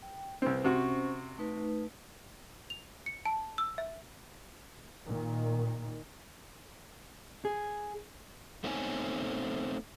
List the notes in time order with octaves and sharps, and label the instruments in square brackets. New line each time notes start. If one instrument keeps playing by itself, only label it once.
[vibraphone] G5
[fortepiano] C2 C4 [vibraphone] B4
[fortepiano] C3 F#4 [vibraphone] C#4 C5 C#6
[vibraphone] A3 D#4 B4
[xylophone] F7
C#7
A5
E6
E5
[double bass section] A#2 D#3
[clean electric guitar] G#4
[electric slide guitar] A3 B3 C4 D#4 C#5 G#5